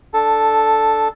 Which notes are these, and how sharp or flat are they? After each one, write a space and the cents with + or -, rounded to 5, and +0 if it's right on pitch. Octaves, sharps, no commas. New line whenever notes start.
D4 +10 A4 +0